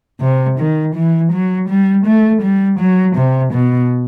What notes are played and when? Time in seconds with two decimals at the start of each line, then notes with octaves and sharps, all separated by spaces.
0.21 C3
0.59 D#3
0.95 E3
1.32 F#3
1.69 G3
2.06 A3
2.42 G3
2.80 F#3
3.16 C3
3.53 B2